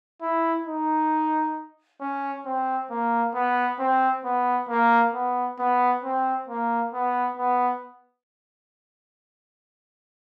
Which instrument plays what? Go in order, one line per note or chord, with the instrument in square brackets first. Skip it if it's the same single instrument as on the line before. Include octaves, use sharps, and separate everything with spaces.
[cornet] E4
D#4
C#4
C4
A#3
B3
C4
B3
A#3
B3
B3
C4
A#3
B3
B3